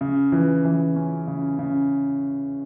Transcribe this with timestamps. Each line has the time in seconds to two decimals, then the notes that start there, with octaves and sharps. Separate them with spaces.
0.01 C#3
0.32 E3
0.64 E3
0.96 C#4
1.27 C#3
1.59 C#3